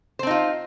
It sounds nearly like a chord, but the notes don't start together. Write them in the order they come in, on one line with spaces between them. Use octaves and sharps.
C5 C4 D#4 F4